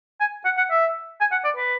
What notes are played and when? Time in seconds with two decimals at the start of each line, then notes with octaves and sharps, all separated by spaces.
0.21 G#5
0.45 F#5
0.58 F#5
0.71 E5
1.20 G#5
1.32 F#5
1.45 D5
1.57 B4